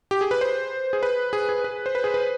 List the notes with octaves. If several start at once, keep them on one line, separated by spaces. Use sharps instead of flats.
G4
G#4
B4
C5
G#4
B4
G#4
G#4
B4
C5
B4
G#4
B4